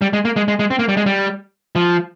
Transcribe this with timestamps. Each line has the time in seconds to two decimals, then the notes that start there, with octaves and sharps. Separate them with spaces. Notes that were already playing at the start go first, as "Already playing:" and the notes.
0.02 G3
0.13 G#3
0.25 A#3
0.36 G#3
0.48 G#3
0.59 G#3
0.70 C4
0.79 A#3
0.89 G3
0.97 G#3
1.06 G3
1.76 F3